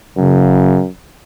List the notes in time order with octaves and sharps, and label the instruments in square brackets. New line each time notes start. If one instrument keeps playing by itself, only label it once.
[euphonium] F#2 [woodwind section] C#3